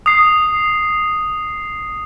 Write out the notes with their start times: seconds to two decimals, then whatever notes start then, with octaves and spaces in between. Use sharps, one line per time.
0.06 D#6 C7